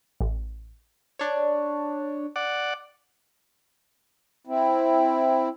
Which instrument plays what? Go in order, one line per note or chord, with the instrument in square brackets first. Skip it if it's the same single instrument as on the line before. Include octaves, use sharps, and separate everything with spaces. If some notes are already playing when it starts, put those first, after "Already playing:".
[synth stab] A1
[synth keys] D4 C#5
[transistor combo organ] D5 F#5
[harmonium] C4 E4